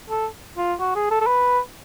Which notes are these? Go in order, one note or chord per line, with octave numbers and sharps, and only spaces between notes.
A4
F4
F#4
G#4
A4
A4
B4